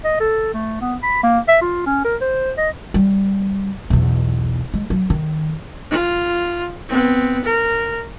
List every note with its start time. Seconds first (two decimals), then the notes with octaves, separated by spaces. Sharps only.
0.04 D#5
0.20 A4
0.54 A3
0.81 B3
1.03 B5
1.23 A#3
1.48 E5
1.62 F4
1.86 C#4
2.05 A#4
2.21 C5
2.57 D#5
2.94 G3
3.90 B1 E2
4.74 G#3
4.90 F#3
5.10 D#3
5.91 F4
6.89 B3 C4
7.45 A#4